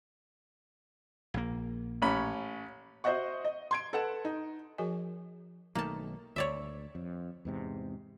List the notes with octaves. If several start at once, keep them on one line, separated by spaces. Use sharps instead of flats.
A#1 A#3
A1 C#4 B5
F#4 C5 D#5 E5 F#5 C#6
D#5
C6 G#6 D7
A4 B4 F#5 E7
D#4
F3 F#4 G#4 A#4 D#5 G#5
B1 D#3 A3 A#3 A5
D2 C#5 D5 E5
F2
E2 G#2 C3